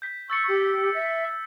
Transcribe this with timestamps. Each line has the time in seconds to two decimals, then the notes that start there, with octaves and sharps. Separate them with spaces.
0.02 G6 B6
0.30 C#6 E6 A6 C#7
0.48 G4
0.94 E5